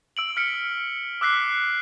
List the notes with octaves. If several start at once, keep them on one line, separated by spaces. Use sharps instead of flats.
E6 D7 F#7
E6 F6 B6 C#7 D7
D6 E6 F#6 B6 C7